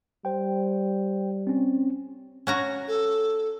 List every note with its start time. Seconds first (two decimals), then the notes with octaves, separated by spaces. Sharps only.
0.25 G3 C5 G5
1.47 C4 C#4
2.47 C#4 F#4 A#5
2.88 A4